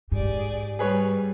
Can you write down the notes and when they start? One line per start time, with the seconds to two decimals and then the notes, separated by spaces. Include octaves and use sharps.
0.12 G#2 G4 G#4 D5
0.79 G3 G#4 B4 C#5